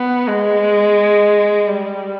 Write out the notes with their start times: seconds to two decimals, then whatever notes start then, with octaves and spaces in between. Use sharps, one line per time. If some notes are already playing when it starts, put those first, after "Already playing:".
Already playing: B3
0.27 G#3
1.67 G3